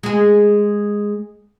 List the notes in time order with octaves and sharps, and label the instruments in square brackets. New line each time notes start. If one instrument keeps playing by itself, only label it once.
[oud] G#3 G#4